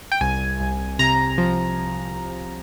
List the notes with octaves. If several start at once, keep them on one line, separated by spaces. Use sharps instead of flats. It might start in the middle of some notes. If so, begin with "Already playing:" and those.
G5
C2 G#5
C2
C3 A#5
F3